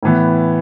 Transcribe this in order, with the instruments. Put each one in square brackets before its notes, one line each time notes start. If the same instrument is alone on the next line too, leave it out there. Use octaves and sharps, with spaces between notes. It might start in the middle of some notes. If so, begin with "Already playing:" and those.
[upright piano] A2 E3 B3